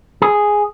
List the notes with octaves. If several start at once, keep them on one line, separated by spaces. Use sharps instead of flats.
G#4